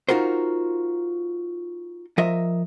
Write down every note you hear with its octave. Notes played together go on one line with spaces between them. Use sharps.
D#4 F4 F#4 A#4 C5
F3 A#4 D#5 E5